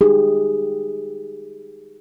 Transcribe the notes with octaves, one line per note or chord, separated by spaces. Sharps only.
D#4 G4 G#4